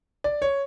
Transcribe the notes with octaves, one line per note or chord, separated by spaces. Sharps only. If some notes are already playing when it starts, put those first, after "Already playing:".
D5
C#5